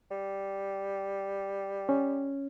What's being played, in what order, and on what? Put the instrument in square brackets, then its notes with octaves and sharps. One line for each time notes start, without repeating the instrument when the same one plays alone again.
[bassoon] G3
[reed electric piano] C#4